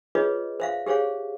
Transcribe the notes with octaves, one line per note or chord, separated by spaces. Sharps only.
F4 G#4 B4 C#5 D#5
C5 E5 F5
G4 G#4 C5 C#5 F5